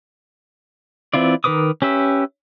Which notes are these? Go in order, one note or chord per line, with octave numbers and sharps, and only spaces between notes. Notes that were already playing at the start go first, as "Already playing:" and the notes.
E3 C4 E4 F4 D5
D#3 A#4 B4 D6 D#6
C#4 G4 B4 E5